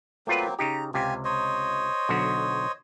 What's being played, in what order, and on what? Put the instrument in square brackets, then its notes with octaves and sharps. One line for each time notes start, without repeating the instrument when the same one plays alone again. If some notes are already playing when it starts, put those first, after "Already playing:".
[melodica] F#3 A#3 C4 [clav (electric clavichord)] A3 F4 B4
[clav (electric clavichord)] C#3 D#4 G4 [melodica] A#5
[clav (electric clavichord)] C#2 C3 [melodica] F4 G4 G#5
[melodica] C5 C#5 D#5
[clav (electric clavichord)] B1 D3 F#4